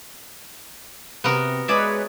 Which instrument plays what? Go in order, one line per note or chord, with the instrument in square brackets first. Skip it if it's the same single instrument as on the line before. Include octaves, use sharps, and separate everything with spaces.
[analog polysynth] C3 [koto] B3 F#4 A#4
[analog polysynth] G#3 B4 C#5 [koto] G#4 D5 E5